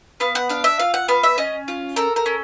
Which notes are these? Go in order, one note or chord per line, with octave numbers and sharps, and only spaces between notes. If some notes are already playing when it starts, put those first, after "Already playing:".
B3 F5
F#5
D4 F5
E5
F4 F5
F#5
B3 F5
E5
C#4 D#5
F4
A4 A#4
A#4
C#4